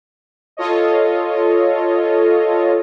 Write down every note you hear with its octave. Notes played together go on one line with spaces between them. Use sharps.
F4 A4 C#5 D#5